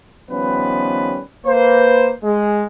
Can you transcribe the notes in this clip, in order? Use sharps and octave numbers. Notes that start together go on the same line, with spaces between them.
D#3 F3 G3 B3 C#4 B4
A#3 B4 C5
G#3